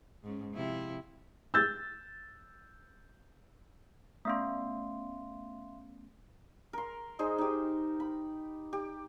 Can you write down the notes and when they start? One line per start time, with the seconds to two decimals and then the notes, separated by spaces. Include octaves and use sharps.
0.24 G#2 C#4
0.54 C3 F3 E4
1.54 E6 G6 A6
4.25 A3 B3 C#4 E5 F5 C6
6.73 A#4 C6
7.19 G#3 D#4 G#4 C5
7.38 D#4 G4
8.00 B5
8.73 G4